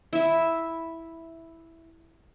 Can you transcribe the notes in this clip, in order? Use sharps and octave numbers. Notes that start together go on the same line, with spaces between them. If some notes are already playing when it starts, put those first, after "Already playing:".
E4 E5